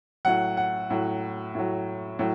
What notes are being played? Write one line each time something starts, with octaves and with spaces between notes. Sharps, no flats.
A2 F#3 F#5
F#5
A2 F#3
A2 F#3
A2 F#3